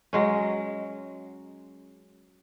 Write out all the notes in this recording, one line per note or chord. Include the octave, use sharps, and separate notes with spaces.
F#3 G#3 C#4